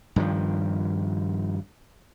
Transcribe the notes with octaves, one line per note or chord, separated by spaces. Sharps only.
G2 D#3 F3